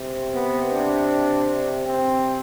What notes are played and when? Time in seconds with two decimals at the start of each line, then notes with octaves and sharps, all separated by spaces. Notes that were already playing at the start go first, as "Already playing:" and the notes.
Already playing: C3
0.34 B3
0.72 D4
1.86 C4